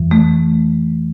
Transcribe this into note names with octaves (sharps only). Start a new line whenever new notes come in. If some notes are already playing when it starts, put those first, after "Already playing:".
Already playing: F2 E3
A3